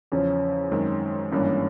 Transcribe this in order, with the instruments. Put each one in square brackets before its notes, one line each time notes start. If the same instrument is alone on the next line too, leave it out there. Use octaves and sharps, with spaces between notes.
[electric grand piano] E2 C#3 F3 [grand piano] C#4
[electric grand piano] F#2 D#3 G#3 C4
[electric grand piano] G#1 G2 E3 G3 A#3 [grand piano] C#4